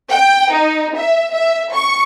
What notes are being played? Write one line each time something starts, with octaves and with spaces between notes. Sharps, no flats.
G5
D#4
E5
E5
C#6